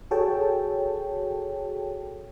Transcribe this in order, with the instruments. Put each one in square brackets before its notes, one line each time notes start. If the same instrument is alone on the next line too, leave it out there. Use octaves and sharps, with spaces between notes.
[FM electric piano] F#4 G#4 A4 C#5 G5 A5